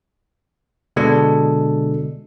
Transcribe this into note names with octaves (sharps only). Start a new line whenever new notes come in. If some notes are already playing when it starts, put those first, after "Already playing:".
B2 D3 G#3 D4 A4